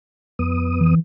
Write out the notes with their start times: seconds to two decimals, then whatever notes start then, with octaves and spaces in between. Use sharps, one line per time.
0.39 F2 B3 D#6
0.81 E3